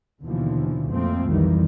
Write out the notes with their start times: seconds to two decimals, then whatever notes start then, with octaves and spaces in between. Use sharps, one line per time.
0.22 D#2 B2 D3 E3 F3
0.91 F2 A#2 F3 A3 C4
1.30 B1 F2 D#3 E3 G3